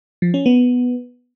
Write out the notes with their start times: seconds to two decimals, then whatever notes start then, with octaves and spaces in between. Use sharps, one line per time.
0.22 F3
0.34 C#4
0.46 B3